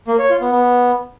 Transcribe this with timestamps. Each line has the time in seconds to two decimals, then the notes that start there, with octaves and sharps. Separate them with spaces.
0.08 A#3
0.19 C#5
0.30 F4
0.41 B3
0.52 B3